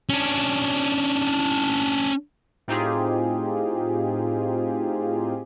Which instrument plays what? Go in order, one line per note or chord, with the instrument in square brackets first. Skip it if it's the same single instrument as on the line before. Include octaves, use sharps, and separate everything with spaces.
[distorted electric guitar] C#4 D4
[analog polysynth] A2 C4 D#4 F4 G4 G#4